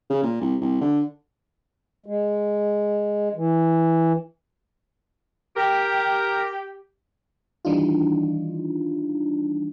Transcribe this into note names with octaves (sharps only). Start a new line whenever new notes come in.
C#3
A#2
C2
C2
D3
G#3
E3
G4 A#4
D#3 E3 G3 D4 D#4 F4